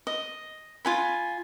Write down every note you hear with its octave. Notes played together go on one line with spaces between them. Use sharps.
D#5
F4 G#5 B5